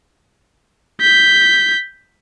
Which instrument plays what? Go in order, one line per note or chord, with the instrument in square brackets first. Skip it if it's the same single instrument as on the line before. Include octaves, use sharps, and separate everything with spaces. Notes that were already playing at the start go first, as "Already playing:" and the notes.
[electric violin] G6 B6